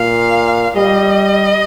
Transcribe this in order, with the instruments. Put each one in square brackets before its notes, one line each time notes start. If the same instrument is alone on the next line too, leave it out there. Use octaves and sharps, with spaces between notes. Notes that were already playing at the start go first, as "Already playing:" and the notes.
Already playing: [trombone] A#2 [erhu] F5
[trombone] G3 [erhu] D#5